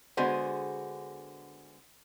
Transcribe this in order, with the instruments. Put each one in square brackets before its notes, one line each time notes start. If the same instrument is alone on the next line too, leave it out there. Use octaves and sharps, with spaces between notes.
[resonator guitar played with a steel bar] D3 G#3 B3 F#4 G#4 C5